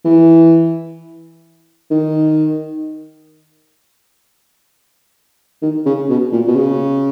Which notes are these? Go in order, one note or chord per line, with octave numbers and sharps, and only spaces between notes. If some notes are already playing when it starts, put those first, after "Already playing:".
E3
D#3
D#3
C#3
B2
A#2
B2
C#3